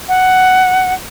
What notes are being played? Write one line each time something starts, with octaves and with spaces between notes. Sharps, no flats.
F#5